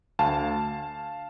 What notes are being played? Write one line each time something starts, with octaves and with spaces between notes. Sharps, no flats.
D2 F5 A5